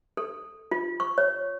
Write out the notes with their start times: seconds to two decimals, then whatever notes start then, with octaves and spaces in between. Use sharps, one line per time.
0.17 A4
0.71 F4
1.00 C#6
1.18 C#5